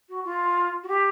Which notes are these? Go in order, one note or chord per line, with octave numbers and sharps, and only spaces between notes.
F#4
F4
F#4
G4